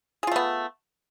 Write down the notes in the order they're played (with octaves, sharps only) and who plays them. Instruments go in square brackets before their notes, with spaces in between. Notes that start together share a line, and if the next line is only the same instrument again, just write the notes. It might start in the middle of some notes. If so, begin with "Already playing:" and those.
[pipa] G#4
F4
A3
B3